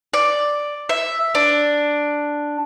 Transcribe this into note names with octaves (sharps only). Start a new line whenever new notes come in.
D5
E5
D4